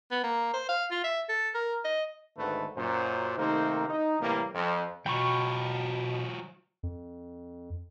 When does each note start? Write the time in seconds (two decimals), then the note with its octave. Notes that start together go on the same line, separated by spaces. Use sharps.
0.11 B3
0.23 A#3
0.53 C5
0.69 F5
0.91 F4
1.04 E5
1.29 A4
1.55 A#4
1.85 D#5
2.37 G#1 G#2 D3 A3 B4
2.77 F#2 A#2 C5
3.37 C3 D#3 A3 A#3 C4 D#4
3.88 D#4
4.20 A2 C3 E3 G3 A#3
4.54 F2
5.06 B2 F#3 F4 G5 B5 C#6
6.83 F2